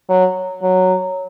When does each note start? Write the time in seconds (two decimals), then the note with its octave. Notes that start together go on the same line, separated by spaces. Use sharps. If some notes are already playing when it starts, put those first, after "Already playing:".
0.09 F#3
0.62 F#3